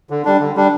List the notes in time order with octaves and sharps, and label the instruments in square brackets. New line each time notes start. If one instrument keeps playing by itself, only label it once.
[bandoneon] D3
G3 D4
D3
G3 D4